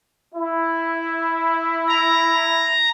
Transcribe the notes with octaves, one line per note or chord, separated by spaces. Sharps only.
E4
A#5